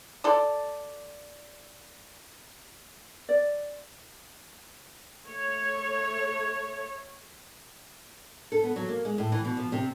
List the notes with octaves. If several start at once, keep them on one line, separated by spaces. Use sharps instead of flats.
A4 D5
D5
A3 C#5
A4
B3
F#3
A#3
G#3
A2
E3
B2
F3
C3